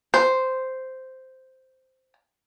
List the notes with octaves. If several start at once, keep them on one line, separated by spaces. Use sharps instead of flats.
C5